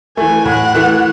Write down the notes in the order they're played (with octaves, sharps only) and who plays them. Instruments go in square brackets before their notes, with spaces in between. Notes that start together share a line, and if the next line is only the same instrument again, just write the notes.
[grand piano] E3 A3 [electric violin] G#5
[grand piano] A2 [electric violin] F#5
[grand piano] E3 A3